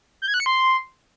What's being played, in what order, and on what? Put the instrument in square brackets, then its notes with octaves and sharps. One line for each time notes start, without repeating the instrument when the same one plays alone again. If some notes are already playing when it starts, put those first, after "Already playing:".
[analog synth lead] G6
G#6
F#6
C#7
C6